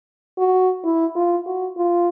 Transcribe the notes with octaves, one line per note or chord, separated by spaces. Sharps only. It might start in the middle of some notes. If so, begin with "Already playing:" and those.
F#4
E4
F4
F#4
F4